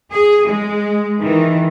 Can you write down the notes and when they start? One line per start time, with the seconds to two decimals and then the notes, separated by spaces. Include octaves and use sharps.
0.13 G#4
0.47 G#3
1.20 D#3 E3